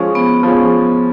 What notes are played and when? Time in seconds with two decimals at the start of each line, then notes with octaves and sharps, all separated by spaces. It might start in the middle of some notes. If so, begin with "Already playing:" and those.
Already playing: F3 G#3 C#4
0.15 B3
0.43 F3 G#3 C#4